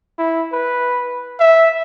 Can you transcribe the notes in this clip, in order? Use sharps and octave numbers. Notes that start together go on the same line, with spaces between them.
E4
B4
E5